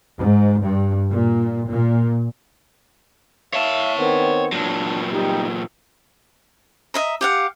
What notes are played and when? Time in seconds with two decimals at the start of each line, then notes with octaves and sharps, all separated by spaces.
0.18 G#2
0.63 G2
1.10 A#2
1.70 A#2
3.54 C#5 E5 F5 A5
3.97 D#3 B3 C4
4.52 A#2 F#3 D4
5.12 G3 D#4 G4
6.94 D#5 E5 A#5
7.21 G4 F5 F#5